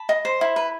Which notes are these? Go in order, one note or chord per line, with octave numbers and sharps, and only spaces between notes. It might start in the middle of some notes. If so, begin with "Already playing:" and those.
Already playing: A5 B5
D#5
C5
E4
B4